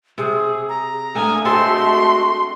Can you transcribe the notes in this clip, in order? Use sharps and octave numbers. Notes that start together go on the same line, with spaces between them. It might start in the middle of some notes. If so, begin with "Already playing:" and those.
C3 G#4
A#5
A3 A#3 D4 G#5 D#6
G#3 A3 C4 F#4 G4 A4 C6